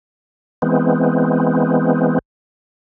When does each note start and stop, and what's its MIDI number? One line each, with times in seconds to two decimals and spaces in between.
0.62 2.19 52
0.62 2.19 56
0.62 2.19 59
0.62 2.19 60